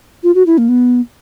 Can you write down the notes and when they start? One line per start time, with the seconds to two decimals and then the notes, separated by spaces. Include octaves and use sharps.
0.23 F4
0.35 F#4
0.46 E4
0.58 A#3
0.69 B3